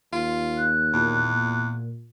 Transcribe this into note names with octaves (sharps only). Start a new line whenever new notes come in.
D#2 F4
F#6
E2 A#2